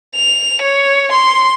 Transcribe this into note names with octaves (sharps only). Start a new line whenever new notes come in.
F7
C#5
C6